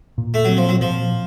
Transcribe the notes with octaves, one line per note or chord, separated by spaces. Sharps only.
A#2
A3
F#3 C4
F3
F#3
A#2 F3